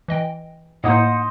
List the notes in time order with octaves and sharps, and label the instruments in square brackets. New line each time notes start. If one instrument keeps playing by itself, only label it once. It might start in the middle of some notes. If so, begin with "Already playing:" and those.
[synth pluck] E3 D#5 G5
[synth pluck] A2 A#3 D#4 [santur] C5 D#5 [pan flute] F#5